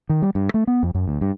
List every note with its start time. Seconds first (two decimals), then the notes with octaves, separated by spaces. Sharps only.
0.09 D#3
0.22 G3
0.35 G2
0.54 A3
0.67 B3
0.83 F2
0.95 F#2
1.08 D2
1.21 G2